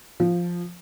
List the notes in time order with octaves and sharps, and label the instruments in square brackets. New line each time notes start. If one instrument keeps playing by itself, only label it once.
[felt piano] F3